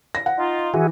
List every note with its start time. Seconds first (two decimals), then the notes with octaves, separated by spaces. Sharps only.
0.15 A#6
0.26 F#5
0.38 D#4 F4
0.74 E3 E4 F#4 G#4